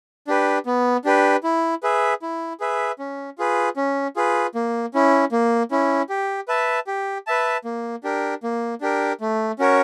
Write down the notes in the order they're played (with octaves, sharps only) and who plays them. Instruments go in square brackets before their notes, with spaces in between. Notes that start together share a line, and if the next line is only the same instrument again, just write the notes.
[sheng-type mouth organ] D4 G4 B4
B3
D4 G4 B4
E4
G#4 B4 E5
E4
G#4 B4 E5
C#4
F4 G#4 B4
C#4
F4 G#4 B4
A#3
C#4 E4
A#3
C#4 E4
G4
B4 E5 A5
G4
B4 E5 A5
A#3
D4 G4 A#4
A#3
D4 G4 A#4
A3
C#4 F#4 A#4 C#5